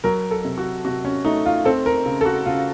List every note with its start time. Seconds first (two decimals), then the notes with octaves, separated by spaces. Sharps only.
0.04 F#3 A#4
0.31 A4
0.45 C3
0.58 F#4
0.85 C3 F#4
1.05 C#4
1.25 A3 D#4
1.46 F4
1.65 C4 A4
1.86 A#4
2.06 C#3
2.21 A4
2.25 F#4
2.46 C#3 F4